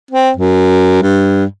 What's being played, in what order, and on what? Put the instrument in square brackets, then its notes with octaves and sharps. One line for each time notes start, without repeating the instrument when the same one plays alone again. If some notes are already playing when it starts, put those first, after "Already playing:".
[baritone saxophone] C4
F#2
G2